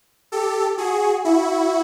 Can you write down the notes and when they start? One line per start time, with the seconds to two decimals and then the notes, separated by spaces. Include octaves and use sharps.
0.32 G4 A4
0.78 F#4 G#4
1.25 E4 F#4